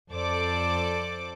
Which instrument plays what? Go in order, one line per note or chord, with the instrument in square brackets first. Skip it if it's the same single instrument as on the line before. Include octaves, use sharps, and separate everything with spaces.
[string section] F2 A4 C5 D5 D6